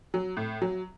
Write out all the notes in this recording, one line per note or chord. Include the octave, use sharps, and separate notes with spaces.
F#3
A2
F#3